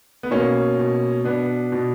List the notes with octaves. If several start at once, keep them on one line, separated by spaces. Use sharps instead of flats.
B3
B2 A#3 C#4
B2
B2 B3 D4
B2